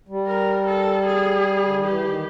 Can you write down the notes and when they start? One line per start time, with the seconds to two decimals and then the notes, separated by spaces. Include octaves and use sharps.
0.08 G3
0.27 A#4
0.67 A4
1.06 G#4
1.64 D3
1.75 D#3
1.84 E3 G4
2.04 D#3